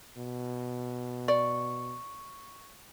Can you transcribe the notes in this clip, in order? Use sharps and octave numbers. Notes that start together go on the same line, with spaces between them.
B2
D5 C#6